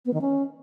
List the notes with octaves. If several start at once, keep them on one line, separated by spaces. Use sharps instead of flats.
B3
D#3
C#4